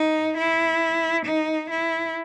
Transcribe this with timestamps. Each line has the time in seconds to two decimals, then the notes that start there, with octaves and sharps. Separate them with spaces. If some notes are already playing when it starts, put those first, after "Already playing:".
Already playing: D#4
0.37 E4
1.25 D#4
1.70 E4